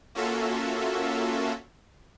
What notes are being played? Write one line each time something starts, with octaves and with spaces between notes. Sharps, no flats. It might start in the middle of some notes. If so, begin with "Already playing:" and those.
A#3 C#4 F4 F#4 A4 E5